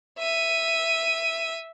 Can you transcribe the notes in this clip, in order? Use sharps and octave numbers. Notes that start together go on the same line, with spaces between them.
E5 D#7